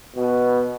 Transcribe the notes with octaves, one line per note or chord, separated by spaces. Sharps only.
B2